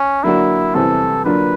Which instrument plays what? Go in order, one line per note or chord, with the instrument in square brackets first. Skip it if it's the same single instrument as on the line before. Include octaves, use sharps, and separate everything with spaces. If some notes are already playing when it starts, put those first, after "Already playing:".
Already playing: [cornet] C#4
[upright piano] D3 F#3 A#3 D4 F#4 [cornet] E4
[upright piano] E2 C3 E3 G3 C4 [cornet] A4
[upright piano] D3 F#3 A#3 D4 F4 [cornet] B4